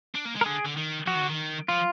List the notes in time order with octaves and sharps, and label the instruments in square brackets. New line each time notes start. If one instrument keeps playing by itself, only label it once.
[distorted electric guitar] D4
A#3
G#3
[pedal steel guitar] A#4
[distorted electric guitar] D3 [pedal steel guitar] G#4
[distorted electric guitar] D3
D#3
[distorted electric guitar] F3 [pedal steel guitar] F#4
[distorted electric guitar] D#3
D3
D#3
[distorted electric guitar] F3 [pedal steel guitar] F4